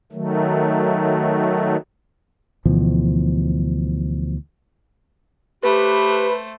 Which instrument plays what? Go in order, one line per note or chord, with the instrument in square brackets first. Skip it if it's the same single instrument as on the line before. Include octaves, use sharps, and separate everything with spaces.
[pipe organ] D#3 F#3 A3
[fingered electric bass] D2 B2 E3 F3
[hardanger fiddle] A3 C5 [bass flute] G4 [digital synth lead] B4